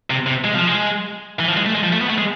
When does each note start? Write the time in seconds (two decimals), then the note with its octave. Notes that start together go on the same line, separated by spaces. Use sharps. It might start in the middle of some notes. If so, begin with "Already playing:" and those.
0.10 C3
0.27 C3
0.45 G#3
0.55 F3
0.67 G#3
1.40 E3
1.48 F3
1.57 G#3
1.66 A3
1.75 G#3
1.84 F3
1.92 A3
2.01 B3
2.10 A3
2.18 G#3